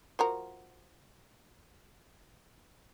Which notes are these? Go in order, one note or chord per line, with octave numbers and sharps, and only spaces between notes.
F3 F#4 A#4